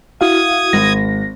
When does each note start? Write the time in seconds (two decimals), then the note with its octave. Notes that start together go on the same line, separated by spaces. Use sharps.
0.21 E4 F#4 F5 D#6 G#6
0.73 G#1 A#6